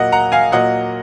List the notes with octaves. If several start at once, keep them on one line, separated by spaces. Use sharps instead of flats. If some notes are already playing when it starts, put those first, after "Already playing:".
Already playing: A#2 F#3 A#3 D#5 F#5
F#5 A#5
F5 G#5
A#2 F#3 A#3 D#5 F#5